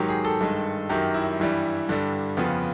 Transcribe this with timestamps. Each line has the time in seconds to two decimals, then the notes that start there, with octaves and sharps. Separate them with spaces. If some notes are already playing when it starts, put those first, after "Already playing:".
Already playing: G#2 D#3 F#3 G4
0.08 G#4
0.25 A4
0.41 G2 D#3 G#3
0.89 F#2 D#3 F#3 G4
1.14 E4
1.40 G2 E3 G3
1.89 G2 D3 G3
2.37 F2 C#3 F3 B3